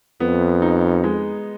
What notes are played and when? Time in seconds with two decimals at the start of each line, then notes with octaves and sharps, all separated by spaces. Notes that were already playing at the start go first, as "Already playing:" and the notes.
0.20 F2 B3
0.62 D#4
1.04 G#3